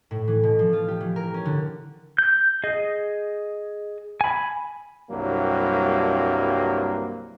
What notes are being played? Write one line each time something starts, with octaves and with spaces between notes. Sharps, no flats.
A2
E3
B2
F3
F4
G4
E3
A#4
C#4
D3
G6
G#4 D#5
G#5 B5
C2 G2 F#3 A#3